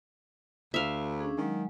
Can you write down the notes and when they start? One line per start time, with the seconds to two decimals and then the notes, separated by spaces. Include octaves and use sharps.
0.74 D2 E5 F5
1.20 C#4 D4 G#4
1.38 D#3 F#3 G#3